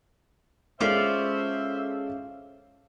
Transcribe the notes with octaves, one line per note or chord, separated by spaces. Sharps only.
G#3 C#4 F4 A4 C5 D5 E5